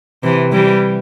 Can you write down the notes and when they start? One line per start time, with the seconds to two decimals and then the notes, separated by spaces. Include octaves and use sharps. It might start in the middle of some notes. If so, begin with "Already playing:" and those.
0.23 C3 E3
0.52 E3 G3